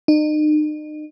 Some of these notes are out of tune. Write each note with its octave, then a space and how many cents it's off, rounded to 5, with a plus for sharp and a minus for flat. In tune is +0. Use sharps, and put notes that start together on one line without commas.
D#4 -40